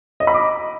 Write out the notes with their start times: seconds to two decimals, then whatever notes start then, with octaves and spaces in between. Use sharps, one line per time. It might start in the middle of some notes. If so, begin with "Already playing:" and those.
0.20 D#5
0.27 B5
0.34 D6